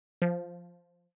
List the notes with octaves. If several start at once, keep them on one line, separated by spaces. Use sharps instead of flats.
F3